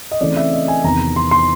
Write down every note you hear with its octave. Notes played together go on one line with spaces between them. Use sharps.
D#5
C#3 E3 A3 C4 D5
E5
D#5
G#5
E2 C3 D#3 A#5
C6
C6